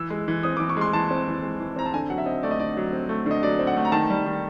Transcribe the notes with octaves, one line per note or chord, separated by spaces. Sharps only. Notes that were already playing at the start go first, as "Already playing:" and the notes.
Already playing: E3 E6
G#3
E3
C4 D#6
D6
E3
C#6
G#3 C6
E3 A5
C4
E3
G#3
E3
C4 A#5
A5
D3 G#5
F#3 F#5
E5
C4 D#5
A3 D5
D#5
D3 D5
F#3
C4
A3
D3 D#5
F#3 D5
C4
F#5
A3
A#5
D#3 A5
G3
D#3